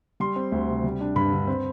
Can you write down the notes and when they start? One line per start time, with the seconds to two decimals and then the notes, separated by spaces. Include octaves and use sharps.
0.20 G3 C6
0.36 C4
0.52 D2
0.69 C3
0.84 G3
1.01 D4
1.16 G2 B5
1.32 D3
1.48 C4